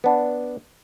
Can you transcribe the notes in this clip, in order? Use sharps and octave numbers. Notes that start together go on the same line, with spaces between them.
B3 D4